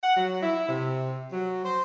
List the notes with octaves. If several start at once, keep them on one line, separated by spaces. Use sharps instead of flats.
F#5
F#3
E4
C3
F#3
C5